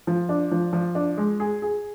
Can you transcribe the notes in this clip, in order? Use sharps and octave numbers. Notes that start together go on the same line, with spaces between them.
F3
D4
F3
F3
D4
G#3
G#4
G#4